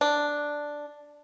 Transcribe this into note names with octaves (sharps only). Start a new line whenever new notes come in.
D4